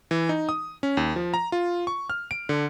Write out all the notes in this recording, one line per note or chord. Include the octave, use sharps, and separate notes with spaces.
E3
D#4
D#6
C#4
D#2
F3
A#5
F4
C#6
F6
D7
D3